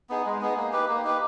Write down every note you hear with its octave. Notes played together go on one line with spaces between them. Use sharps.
B3 D#4 G#4
G#3
B3 D#4 G#4
A#3
D#4 G4 B4
A#3
D#4 G4 B4